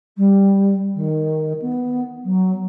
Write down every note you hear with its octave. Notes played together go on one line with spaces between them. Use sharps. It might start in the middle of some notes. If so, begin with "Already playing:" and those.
G3
D#3
B3
F#3